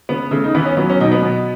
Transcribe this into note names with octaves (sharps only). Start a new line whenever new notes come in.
C#3 B3
C#3 A3
D#4
E3 B3
C#4
F#3 B3
C#4
B2 D#4
B3
B2